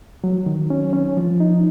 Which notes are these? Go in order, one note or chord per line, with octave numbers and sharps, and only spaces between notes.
F#3
D#3
C#4
C#4
F3
D#4